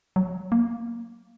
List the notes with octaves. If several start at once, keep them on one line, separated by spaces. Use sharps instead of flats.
F#3
A#3